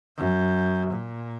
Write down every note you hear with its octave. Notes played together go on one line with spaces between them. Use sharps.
F#2
A#2